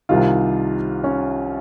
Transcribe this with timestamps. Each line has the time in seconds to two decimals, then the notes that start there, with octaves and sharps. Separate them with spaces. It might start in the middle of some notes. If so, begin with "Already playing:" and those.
0.09 C2 C3 D#3 F4
1.04 C#4